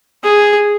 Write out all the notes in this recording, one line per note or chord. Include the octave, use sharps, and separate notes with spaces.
G#4